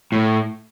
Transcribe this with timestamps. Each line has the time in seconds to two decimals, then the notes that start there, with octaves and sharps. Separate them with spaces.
0.12 A2